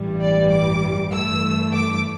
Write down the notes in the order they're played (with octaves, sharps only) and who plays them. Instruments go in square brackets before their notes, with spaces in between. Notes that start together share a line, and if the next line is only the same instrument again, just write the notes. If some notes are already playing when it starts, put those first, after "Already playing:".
Already playing: [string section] A1 G2 E3 G3
D5
D6
G2 E3 A3 E6
D6